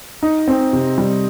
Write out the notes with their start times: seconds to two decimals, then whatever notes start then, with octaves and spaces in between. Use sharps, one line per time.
0.23 D#4
0.48 C4
0.73 C3
0.98 G3